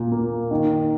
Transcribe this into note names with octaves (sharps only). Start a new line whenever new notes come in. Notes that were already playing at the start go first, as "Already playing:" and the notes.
Already playing: A#2
A#3
D#3